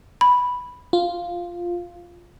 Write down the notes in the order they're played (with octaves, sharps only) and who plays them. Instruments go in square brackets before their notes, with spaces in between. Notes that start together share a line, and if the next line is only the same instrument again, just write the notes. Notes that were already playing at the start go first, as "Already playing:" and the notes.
[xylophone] B5
[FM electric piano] F4